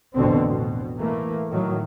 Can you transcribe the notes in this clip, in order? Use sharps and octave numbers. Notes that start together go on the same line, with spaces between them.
A1 F2 B2 D3 C4
B2
E3 A3 A#3
A2 D#3 F#3